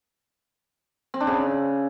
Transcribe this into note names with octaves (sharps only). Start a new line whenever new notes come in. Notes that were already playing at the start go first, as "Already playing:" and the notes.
C4
D4
C#3